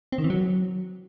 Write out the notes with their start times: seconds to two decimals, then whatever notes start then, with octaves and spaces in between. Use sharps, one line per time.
0.12 C4
0.18 D#3
0.24 E3
0.30 F#3